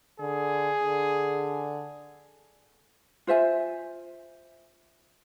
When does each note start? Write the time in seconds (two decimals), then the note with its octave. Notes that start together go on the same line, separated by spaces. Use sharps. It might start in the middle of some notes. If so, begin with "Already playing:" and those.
0.20 D3 G#4
0.84 D3
3.27 F4 C5 E5 G#5